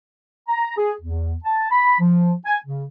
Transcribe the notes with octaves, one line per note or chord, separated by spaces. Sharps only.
A#5
G#4
E2
A5
B5
F3
G#5
C#3